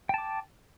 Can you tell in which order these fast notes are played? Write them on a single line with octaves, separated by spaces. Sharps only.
G5 A5 D6